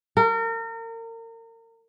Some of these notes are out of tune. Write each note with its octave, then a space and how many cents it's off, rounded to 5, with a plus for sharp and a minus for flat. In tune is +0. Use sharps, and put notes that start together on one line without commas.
A#4 -35